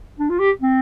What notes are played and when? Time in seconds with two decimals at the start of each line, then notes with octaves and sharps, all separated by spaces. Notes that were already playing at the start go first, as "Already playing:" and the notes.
0.19 D4
0.30 F4
0.39 G4
0.61 C4